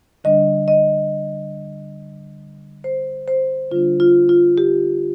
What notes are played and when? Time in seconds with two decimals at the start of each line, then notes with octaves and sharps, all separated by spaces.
0.24 D3 G3 D4 D#5
0.68 D#5
2.84 C5
3.28 C5
3.71 D3 G3 D4 F4
4.00 F4
4.29 F4
4.58 G4